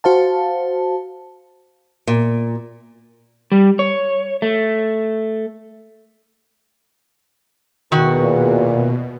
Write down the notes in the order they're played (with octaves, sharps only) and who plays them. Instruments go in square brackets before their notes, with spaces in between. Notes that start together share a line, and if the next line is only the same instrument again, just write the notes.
[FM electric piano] F#4 C5 F5 A5
[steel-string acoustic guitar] A#2
[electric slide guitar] G3
C#5
A3
[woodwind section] E2 [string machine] B2 [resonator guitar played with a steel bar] D#3 F#4
[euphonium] A#2